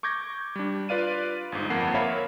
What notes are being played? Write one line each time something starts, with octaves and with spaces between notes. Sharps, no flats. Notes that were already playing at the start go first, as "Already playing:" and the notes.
C#6 D6 G6 G#6 A#6
G3 D4
F4 B4 D5 F5 D#7
G1 G#2
G1 F2 A#3 F#5 C7
A#4 C#5 E5 F5 B5